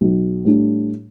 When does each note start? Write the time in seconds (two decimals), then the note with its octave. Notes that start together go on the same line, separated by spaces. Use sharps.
0.01 B1
0.45 A2 G3 D4